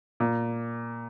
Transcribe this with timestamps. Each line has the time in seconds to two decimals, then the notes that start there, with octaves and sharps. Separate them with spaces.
0.20 A#2